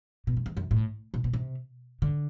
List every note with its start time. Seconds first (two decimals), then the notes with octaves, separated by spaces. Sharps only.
0.27 B2
0.37 F#2
0.46 E2
0.57 F#2
0.71 A2
1.14 B2
1.24 B2
1.33 C3
2.02 D3